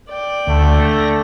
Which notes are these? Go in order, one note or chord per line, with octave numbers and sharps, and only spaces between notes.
D5 G5
D2 D3 A3
A#6